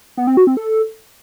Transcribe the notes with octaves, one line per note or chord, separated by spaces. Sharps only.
B3
C4
F#4
C4
A4